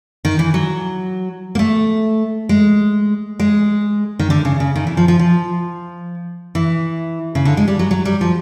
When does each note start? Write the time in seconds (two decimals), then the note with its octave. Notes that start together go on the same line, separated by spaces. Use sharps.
0.25 D#3
0.39 E3
0.54 F#3
1.55 A#3
1.59 A3
2.49 G#3
3.40 G#3
4.19 D#3
4.30 D3
4.45 C#3
4.60 C#3
4.76 D#3
4.87 E3
4.97 F3
5.08 F3
5.19 F3
6.55 E3
7.35 C#3
7.45 D3
7.57 G#3
7.68 G3
7.79 F#3
7.91 F#3
8.05 G3
8.21 F3